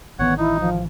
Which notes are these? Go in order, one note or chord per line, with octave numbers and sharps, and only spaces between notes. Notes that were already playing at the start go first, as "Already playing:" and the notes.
A1 D#3 E3 B3 C#5 F#5
D#4 E4
F3